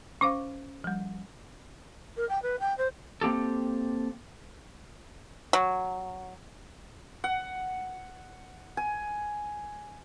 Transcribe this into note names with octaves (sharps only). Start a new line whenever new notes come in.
C#4 C5 F5 C#6 D6
F3 G3
A#4
G5
B4
G5
C5
A#3 C4 G4 A4
F#3
F#5
G#5